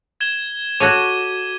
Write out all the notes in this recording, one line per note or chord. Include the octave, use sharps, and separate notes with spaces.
G#6 E7 G7
F#4 A4 C#5 D6 D#7